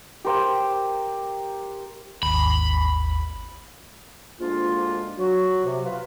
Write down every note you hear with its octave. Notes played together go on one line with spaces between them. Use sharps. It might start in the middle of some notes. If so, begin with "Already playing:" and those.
G4 A#4 C5 G5
G#1 D#2 B5
D2 G#2 G#3 A#3 D4 F4
F#3 F#4
C3
F4 B4